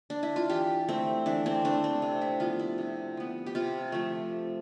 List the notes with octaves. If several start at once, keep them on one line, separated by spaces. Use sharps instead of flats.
D4
E4
F4
E3 G4
A3 C4
E3 D4
C4
A3 D4
C4
C3
E4
F3 B3 F4
E4
C3
F3 B3
G4
C3 F4
F3 A3